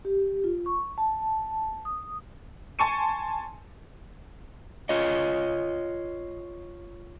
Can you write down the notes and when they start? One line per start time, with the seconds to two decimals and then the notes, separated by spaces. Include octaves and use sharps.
0.05 G4
0.44 F4
0.66 C#6
0.98 A5
1.85 D#6
2.79 G#5 A5 C6 C#6 C#7 D#7
4.89 F4 C#5 D#5